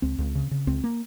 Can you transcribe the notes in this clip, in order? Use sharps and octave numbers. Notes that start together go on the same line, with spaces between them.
C#2 C4
C#2
C#3
C#3
C#2 C4
A#3